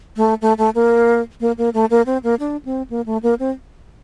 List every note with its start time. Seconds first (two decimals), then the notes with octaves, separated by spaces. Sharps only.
0.17 A3
0.42 A3
0.58 A3
0.75 A#3
1.40 A#3
1.58 A#3
1.74 A3
1.90 A#3
2.06 C4
2.23 A#3
2.39 D4
2.65 C4
2.90 A#3
3.06 A3
3.23 A#3
3.39 C4